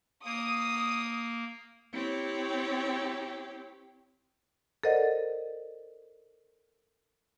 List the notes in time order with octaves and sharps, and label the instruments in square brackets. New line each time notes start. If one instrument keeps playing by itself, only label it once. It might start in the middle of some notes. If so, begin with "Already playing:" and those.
[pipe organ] A#3 [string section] D#6
[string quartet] C4 E4 G4 C#5
[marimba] A4 A#4 C5 D5 D#5 F#5